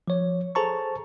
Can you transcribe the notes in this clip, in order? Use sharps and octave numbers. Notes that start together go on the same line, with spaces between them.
F3 C#5
G#4 A4 C5 A5 A#5 C#6